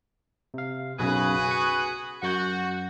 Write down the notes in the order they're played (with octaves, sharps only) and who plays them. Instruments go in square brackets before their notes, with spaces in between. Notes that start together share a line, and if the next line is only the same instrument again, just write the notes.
[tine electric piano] C3 F5
[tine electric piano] B1 F#2 C#3 [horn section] F#4 G#4 B4
[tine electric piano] C#6
[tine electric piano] F#2 G6 [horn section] F#4